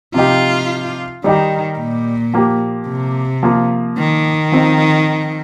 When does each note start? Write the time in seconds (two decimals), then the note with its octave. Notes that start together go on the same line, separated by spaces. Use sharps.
0.14 C3 F3 D#4 F4 G4
1.24 D#3 G3 D#4 G4
1.78 A#2
2.34 F3 A#3 G4
2.88 C3
3.43 F3 A#3 F4
3.97 D#3
4.52 F3 C4 D#4